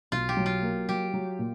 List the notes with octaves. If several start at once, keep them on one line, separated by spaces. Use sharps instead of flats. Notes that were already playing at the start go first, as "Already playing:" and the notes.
B1 F4
G4
F#3
F4
A#3
F#3 G4
F#3
A#2